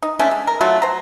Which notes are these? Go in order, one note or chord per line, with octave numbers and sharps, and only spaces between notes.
D#4
D3 A3 C#4 D4
G#3
A#4
F#3 A3 F4 F#4
C5 A#5